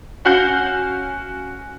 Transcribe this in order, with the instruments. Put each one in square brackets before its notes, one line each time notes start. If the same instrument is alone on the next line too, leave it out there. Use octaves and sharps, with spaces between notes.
[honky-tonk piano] C#4 F#4 F5 G6 C#7